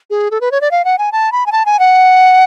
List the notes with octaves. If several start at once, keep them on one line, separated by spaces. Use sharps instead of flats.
G#4
A4
B4
C#5
D5
F5
F#5
G#5
A5
B5
G#5
A5
G#5
F#5